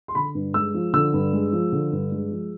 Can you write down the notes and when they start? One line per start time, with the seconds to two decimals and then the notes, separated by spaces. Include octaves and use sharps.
0.08 C6
0.15 D3 B5
0.35 G2
0.54 G#3 E6
0.74 F3
0.93 D3 E6
1.14 G2
1.33 G#3
1.53 F3
1.72 D3
1.92 G2
2.12 G#3
2.31 F3